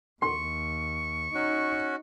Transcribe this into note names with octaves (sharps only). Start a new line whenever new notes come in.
D#2 C6 C#6
C#4 D#4 F#4